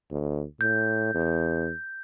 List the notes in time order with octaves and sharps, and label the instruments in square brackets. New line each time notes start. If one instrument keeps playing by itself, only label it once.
[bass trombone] D2
[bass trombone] A2 [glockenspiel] G6
[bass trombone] E2